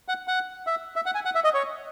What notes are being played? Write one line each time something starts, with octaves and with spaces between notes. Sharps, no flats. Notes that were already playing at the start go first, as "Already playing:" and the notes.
F#5
F#5
E5
E5
F#5
G#5
F#5
E5
D#5
C#5